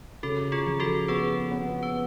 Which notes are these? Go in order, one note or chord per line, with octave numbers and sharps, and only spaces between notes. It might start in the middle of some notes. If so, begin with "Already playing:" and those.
C#3 F#4 A4
F4 G#4
F3
F#4 A4
B3 G#4 B4
B3
B4